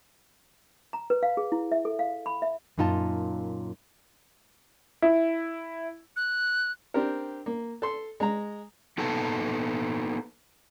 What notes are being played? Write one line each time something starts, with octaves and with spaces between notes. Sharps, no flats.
A#5
B4
F5
G#4
E4
E5
A4
F5
B5
E5
F#2 A#2 D#4 F4 G#5 A5
E4
F#6
C4 D4 G4 A#4
A#3
A4 C6
G#3 A#5
A#3 B3 D#4 A4 B4 A5